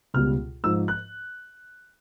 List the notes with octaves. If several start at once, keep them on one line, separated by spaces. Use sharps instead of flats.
C#2 B2 G3 F6
G#2 F3 E6
F#6